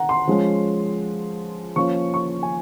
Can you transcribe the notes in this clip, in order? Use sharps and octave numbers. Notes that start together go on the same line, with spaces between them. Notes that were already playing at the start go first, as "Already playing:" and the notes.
Already playing: F#5 A#5
C6
F3 G#3 C#4
F3 A#3 C#4 C#6
C#6
G#5